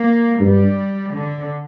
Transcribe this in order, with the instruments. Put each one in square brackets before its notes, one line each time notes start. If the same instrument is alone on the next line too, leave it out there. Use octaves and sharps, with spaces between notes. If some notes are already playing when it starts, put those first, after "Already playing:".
Already playing: [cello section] A#3
[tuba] G2 [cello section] G3
[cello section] D3